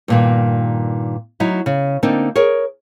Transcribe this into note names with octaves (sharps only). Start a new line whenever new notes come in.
G2 A#2 D#3
F#3 D#4 E4
C#3
D3 A#3 C4 D4 D#4
G#4 A#4 C#5